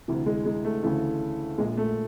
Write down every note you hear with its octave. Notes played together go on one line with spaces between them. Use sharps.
D2 C3 E3
G#3
G#3
A3
D2 C#3 E3 A3
A#1 A#2 G#3
A3